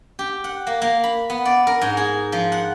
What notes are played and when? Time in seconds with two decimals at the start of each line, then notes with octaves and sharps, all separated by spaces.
0.19 G4
0.44 F#5
0.67 A#3
0.82 A#3
1.04 B5
1.30 B3
1.45 D5
1.67 A#4
1.82 G#2
1.97 G#4
2.32 F3
2.52 F#5